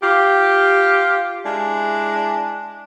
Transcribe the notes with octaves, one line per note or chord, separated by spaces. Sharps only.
F4 G4
G#3 D4 E4